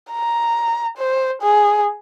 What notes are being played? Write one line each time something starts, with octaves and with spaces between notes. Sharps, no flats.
A#5
C5
G#4